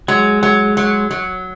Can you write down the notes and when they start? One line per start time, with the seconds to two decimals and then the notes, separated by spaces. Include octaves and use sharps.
0.08 F#3 G#3
0.43 F#3
0.77 F#3
1.11 F#3